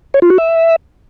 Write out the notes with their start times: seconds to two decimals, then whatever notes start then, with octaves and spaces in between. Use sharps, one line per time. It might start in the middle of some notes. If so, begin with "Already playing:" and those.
0.14 C#5
0.22 F4
0.30 F#4
0.38 E5